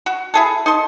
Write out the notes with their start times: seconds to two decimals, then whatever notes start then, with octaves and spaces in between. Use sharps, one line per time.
0.06 F#4
0.34 E4 G#4 A4
0.66 D#4 A4 C6